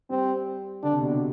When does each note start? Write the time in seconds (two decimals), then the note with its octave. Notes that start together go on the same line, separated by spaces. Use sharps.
0.10 G3 C4
0.83 D3 D4
0.92 C3
1.01 B2
1.10 C3